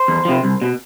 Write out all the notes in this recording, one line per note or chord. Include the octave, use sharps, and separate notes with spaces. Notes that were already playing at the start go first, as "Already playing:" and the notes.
Already playing: C5
E2
C3 F3
C2
B2